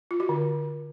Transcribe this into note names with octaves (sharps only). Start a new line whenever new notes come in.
F4
F#4
D3